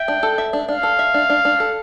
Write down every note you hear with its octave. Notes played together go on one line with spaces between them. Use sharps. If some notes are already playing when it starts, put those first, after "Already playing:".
Already playing: E5 G5
D4
A4
E5
D4
D4 F5
A4
E5
D4
D4
D4
A4